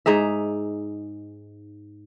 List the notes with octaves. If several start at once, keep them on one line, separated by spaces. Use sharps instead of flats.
G#2 D#4 G#4 E5